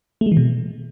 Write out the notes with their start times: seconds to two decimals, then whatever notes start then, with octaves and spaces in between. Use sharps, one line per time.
0.21 A3
0.26 G#3
0.32 E3
0.37 B2